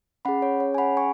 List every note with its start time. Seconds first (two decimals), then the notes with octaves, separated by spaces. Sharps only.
0.25 C#4 F#5 B5
0.28 G#4
0.42 C#5
0.60 C#5
0.75 G#5
0.78 F#5 B5
0.97 G#5 C#6